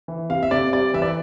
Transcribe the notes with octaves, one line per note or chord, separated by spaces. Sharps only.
E3
C3 F5
E5
C3 D5
G3 D5
E3 E5
D5